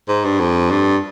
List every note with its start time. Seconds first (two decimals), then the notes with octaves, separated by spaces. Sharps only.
0.08 G#2
0.25 G2
0.40 F2
0.71 G2